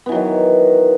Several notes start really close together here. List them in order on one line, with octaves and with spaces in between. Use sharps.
B3 E3 F#3 D#3